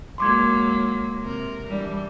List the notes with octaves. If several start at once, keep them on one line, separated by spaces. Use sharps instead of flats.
F#3 G#3 A#3 C6 D6 G#6
C3 A#4
E3 G3 D4